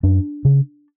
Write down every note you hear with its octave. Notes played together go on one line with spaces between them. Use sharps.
F#2 D4
C#3